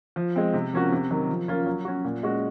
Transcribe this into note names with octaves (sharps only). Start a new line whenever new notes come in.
F3
G#3 C4
C3
F3 A#3 C#4 F#4
C3
D#3 F#3
F3
A#3 C#4 F4
F#3
C#4 F#4
A#2
G#3 C#4 F#4